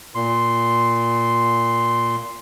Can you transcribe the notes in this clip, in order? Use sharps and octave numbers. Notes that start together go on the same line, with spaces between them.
A#2 C6